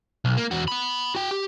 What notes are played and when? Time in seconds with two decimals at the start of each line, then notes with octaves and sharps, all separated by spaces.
0.25 B1
0.37 A#3
0.51 E2 F#4
0.68 F#5 B5
1.15 F#4 G5
1.31 G4